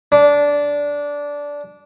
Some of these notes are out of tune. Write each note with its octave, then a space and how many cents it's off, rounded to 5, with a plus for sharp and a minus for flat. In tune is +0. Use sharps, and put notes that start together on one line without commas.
D4 -15